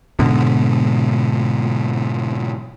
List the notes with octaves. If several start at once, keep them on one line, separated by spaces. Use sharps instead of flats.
G#2 B2 D3